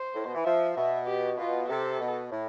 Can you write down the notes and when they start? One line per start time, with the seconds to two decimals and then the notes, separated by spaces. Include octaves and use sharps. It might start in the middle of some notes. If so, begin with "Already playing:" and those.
Already playing: C5
0.14 A2
0.24 B2
0.35 E3
0.45 F3 E5
0.76 B2 E5
1.07 G4
1.38 B2 F4
1.68 C3 A4
2.00 B2
2.31 A2